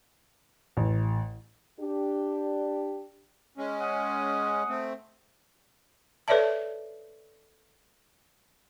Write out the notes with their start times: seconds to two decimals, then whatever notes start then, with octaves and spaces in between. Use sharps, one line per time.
0.77 A1
1.80 D4 G4
3.58 G#3 C#4
3.80 F#5 G#5 D#6
4.69 A3 C4
6.28 A4 B4 C#5 D5 E5 A5